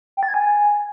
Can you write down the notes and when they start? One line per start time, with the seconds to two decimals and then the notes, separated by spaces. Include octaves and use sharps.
0.17 G5
0.23 A6
0.28 G#6
0.34 G#5